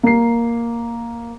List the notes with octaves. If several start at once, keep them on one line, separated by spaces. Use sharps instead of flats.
A#3 C7